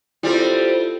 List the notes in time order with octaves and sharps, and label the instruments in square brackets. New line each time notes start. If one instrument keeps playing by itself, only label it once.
[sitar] G3 C4 [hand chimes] E4 F4 A4